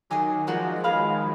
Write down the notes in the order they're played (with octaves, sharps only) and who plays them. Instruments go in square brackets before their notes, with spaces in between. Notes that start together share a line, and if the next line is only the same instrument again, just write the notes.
[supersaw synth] D#3 F#3 [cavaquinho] G#4 D#5 G#5 D6
[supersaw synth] F3 G#3 [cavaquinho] D#4 F#4 A#4 D5
[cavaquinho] G#4 B4 F5 B5